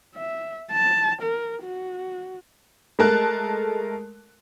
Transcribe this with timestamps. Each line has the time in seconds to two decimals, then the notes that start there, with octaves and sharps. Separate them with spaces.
0.16 E5
0.71 A5
1.22 A#4
1.63 F#4
2.99 G#3 A3 A#4 A5 F#6